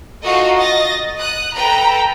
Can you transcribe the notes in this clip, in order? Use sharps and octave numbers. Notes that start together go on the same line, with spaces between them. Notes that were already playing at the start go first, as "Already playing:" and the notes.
D#4 F4 F#4 A4 D#5
D#5 A6 A#6
D#6 F#6
A4 B4 G5 A#5 B5